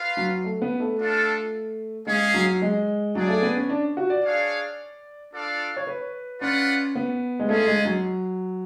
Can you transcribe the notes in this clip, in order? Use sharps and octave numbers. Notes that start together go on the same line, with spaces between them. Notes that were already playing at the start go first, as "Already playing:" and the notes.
Already playing: F4 B4 F5
F#3
A3
B3
A3
D4 F4 A4 F5
G#3 C#4 G#4 C#5 F5
F#3
G#3
F#3 D4 G#4 D5
A3
B3
C#4
D4
F#4
D5
D4 G#4 C#5 F5
D4 F4 A4 D5 F5
C#5
B4
C#4 F4 B4 D5 F#5
B3
G#3
A3 C#4 F4 G#4
G#3
F#3